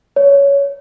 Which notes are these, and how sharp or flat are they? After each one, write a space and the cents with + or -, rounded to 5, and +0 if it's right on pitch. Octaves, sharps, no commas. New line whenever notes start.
C#5 +15